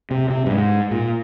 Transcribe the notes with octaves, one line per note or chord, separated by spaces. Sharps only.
C3
C3
G2
G#2
A#2